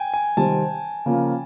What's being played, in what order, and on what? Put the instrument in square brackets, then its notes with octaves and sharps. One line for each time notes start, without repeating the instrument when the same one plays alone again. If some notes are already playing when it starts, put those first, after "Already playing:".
Already playing: [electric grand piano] G5 G#5
G#5
[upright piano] C3 D#3 G3 C4 [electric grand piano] A5
[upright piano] C#3 F3 A#3